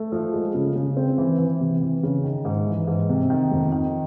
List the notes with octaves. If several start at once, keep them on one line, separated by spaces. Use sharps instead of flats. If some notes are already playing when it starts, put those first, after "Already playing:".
Already playing: A3
F3
G#3
C#3
C#3
C4
E3
E3
C3
E3
C#3
D#3
G#2
E3
G#2
C3
D#3
F2
D#3